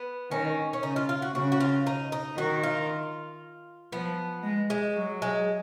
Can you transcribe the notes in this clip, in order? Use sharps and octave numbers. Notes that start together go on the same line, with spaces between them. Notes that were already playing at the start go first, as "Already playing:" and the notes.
Already playing: B3
D#3 C#4
C#4
C#3 D#4
F4
F4
F#4
C#3 F#4
F#4
F4
D#4
D#4
D#3 F#4
F4
F3 B3
G#3
G#3
F#3
G#3